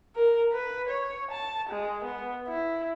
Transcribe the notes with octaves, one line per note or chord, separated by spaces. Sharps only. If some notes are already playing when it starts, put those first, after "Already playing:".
A#4
B4
C#5
A5
G#3
B3
E4